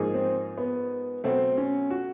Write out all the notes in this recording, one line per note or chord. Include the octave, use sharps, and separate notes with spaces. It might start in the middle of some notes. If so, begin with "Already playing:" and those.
Already playing: G#2 F3 A#3 D#4 G#4
C4
B3
B2 F#3 A3 C4
C#4
F#4